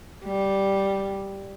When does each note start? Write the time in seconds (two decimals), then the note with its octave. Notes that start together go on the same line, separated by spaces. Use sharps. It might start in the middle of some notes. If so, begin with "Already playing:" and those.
0.25 G3